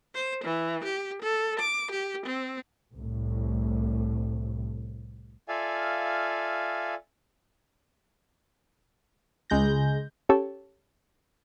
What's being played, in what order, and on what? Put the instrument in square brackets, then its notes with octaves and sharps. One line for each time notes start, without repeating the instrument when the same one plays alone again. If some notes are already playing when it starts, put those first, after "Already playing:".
[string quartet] C5
E3
G4
A4
D6
G4
C4
[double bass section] C2 A2
[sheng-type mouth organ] F4 A4 D5 E5 F5 G#5
[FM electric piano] C#2 G#3 G6 A#6
[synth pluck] C#4 G4 A4 C#5